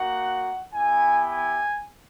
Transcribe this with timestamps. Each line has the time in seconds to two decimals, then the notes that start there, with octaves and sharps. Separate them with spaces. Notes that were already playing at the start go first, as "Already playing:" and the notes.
Already playing: A#3 D#4 F#4 F#5
0.72 B3 E4 G4 G#5
1.29 G#5